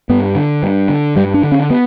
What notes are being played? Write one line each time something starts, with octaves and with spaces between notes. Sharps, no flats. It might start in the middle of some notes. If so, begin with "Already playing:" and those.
G2 B3
D3
G2
D3
G2 G3
D4
D3
C#4
B3